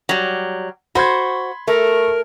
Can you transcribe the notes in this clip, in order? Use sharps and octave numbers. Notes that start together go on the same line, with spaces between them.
F#3 G3
F#4 C5 B5 C6 G#6
A3 A#4